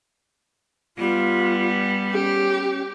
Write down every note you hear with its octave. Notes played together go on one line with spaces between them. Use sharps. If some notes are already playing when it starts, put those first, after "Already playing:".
G3 B3 F4
C#4 G4